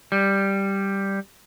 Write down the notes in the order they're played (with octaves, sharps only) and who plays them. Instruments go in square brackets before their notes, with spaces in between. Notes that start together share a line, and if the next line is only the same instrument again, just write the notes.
[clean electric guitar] G3